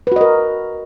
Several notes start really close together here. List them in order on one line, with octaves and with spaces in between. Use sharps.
B4 F#4 D#5 A#4